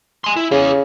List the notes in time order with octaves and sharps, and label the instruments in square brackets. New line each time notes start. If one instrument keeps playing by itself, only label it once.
[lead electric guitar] G#5 C6
E4
[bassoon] C#3 [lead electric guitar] E4 G#4